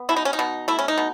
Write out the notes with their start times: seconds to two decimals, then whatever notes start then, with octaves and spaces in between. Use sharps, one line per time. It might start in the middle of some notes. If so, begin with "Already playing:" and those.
Already playing: B3
0.09 B2 E4
0.16 D#4
0.25 C#4
0.33 D#4
0.39 B2
0.68 A3 E4
0.79 C#4
0.88 D#4
0.98 B2